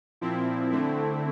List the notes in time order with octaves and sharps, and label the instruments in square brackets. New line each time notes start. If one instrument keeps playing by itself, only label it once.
[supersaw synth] A#2 F3 C4 E4
D3 A3 C4 E4